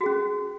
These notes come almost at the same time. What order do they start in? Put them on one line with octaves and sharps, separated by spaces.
F#4 G#4 C#4